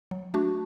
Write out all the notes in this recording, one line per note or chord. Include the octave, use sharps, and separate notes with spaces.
F#3
A3 D4 F#4